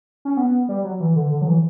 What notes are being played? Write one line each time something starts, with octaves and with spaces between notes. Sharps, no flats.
C#4
B3
G3
F#3
E3
D3
D3
F#3
E3